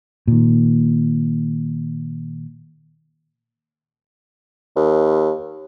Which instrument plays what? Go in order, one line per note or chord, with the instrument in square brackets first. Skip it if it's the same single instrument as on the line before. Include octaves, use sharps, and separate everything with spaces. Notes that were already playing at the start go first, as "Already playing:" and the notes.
[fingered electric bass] A#2 D#3
[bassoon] D#2